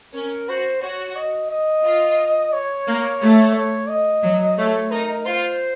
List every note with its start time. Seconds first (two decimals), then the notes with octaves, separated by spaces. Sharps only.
0.14 C#4 A#4
0.48 F#4 C5
0.82 F#4 C#5
1.16 D#5
1.50 D#5
1.84 F4
2.53 C#5
2.87 A#3
3.21 A3
3.55 C#5
3.89 D#5
4.24 F#3
4.57 A3 C#5
4.91 D#4 A#4
5.25 F4 C5